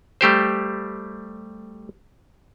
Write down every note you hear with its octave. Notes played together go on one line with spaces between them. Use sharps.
G3 A3 G4 C5